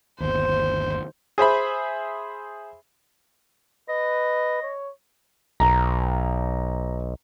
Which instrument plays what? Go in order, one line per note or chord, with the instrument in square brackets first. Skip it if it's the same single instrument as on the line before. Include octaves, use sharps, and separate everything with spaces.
[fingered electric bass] G1 D#2 [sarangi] C5
[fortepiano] G#4 C5 E5 B5
[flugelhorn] B4 [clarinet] D#5
[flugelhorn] C#5
[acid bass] B1 [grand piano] A#5